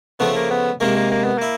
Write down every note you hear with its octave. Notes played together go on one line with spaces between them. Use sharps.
C#3 F3 A3 B3
A#3
B3
C3 D#3 G#3 A#3
A#3
A#3
B3
A#3 E4